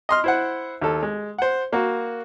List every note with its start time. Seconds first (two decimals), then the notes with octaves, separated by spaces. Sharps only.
0.09 D#5 C6 F6
0.24 E4 C5 F#5
0.82 D#2 A4
1.03 G#3
1.38 C5 F#5
1.73 A#3 F#4